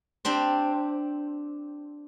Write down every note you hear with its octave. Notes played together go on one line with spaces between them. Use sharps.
C4 D4 G4 C5